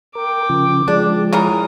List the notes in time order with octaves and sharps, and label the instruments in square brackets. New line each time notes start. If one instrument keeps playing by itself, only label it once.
[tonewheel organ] A#4 [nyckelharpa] G5 D6
[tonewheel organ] C#3 F3
[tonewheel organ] F3 G#3 [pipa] D4
[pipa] C#3 E3 A#4 [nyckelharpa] D#6